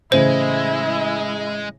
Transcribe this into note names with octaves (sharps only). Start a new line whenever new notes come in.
A2 C#3 E3 G#3 E4 C5